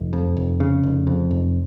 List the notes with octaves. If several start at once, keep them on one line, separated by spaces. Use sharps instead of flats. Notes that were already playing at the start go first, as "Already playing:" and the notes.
Already playing: F1
F2
F1
C#3
F1
F2
F1